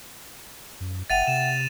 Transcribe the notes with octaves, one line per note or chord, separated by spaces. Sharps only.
F#2
F#1 E5 F#5 G5 A6 D#7 F7
C3 E7